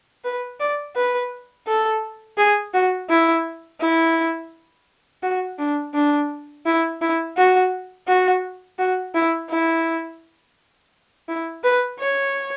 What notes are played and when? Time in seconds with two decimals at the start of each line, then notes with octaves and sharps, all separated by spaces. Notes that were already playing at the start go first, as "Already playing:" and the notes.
0.24 B4
0.60 D5
0.96 B4
1.67 A4
2.37 G#4
2.73 F#4
3.09 E4
3.80 E4
5.22 F#4
5.58 D4
5.94 D4
6.65 E4
7.01 E4
7.37 F#4
8.07 F#4
8.79 F#4
9.14 E4
9.50 E4
11.28 E4
11.63 B4
11.99 C#5